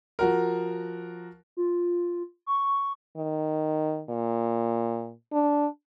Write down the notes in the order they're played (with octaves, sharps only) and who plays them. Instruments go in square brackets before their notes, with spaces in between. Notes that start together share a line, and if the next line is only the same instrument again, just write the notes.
[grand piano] F3 F#4 A#4
[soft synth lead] F4
C#6
[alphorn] D#3
A#2
D4